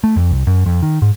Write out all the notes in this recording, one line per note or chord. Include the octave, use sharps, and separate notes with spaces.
A3
F2
C2
F#2
F2
D#3
G#2